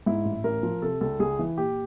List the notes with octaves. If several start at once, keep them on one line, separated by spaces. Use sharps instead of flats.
G#2 E4
A1
A1 A#4
F3
C3 A4
C#2 A4
C#2 G#4
E3
A#2 G4